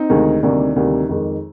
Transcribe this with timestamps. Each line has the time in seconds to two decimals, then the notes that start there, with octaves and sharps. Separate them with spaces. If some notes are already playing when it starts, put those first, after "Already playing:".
Already playing: C4 D#4
0.10 D2 C3 D#3 G#3
0.43 D2 C3 D#3 G3 A#3 D4
0.76 D2 C3 D#3 G3
1.09 F2 D#3 G#3